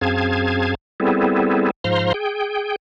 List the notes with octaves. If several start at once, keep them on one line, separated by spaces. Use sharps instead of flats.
F#2 C4 G#4 F5 A5 G#6
G3 B3 C4 E4 G#4 A4
G#2 F3 C5 F5 A#5 C6
G#4 G5